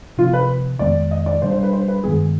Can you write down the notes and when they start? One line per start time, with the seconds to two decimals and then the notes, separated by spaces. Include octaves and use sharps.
0.17 C3 F3 B3 F4
0.33 B4
0.79 F2 D#3 G#3 B3 D5
1.11 D#5
1.26 D5
1.41 B2 G3 D4 C5
1.52 C5
1.63 B4
1.73 C5
1.88 B4
2.04 G2 D#3 G#3 B3 G#4